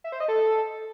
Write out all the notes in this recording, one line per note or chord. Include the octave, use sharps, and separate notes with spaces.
E5
C5
D#5
A4